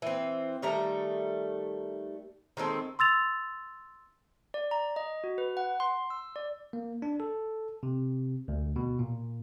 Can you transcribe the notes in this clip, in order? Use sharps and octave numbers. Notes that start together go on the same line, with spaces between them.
E3 C4
D#3 G3 A3 A#5
D#3 G#3 C4 A4
C6 E6 A6 F7
D5
A#5
D#5
F#4
B4
F#5
C6
E6
D5
A#3
D4
A4
C3
D2
B2
A#2